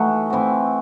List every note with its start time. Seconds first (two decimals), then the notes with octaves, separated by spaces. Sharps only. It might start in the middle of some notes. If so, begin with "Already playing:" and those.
Already playing: E3 A3 D#4 F#4
0.30 E3 C4 F#4